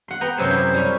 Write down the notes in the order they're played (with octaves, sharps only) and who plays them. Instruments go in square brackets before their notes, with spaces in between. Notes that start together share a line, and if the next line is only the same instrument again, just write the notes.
[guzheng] F#5 C6
B3 G5 A#5
F#2 C3 F#3 C4 G#4 C5
E4
G3 C#4